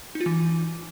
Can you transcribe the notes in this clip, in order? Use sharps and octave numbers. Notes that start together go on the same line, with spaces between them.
D#4
F4
E3